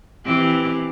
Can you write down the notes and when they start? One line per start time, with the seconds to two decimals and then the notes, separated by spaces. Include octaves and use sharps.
0.25 E3 C4 G4